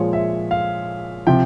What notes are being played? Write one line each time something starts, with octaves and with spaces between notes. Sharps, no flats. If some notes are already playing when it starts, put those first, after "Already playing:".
Already playing: A#2 F3 G#3 C#5
E5
F5
C3 F3 G5